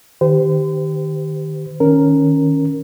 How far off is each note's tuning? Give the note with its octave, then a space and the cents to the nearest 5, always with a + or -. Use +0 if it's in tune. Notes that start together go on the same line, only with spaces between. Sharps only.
D#3 -20 G4 +0 C5 -40
D#3 +0 C#4 +0 A#4 +0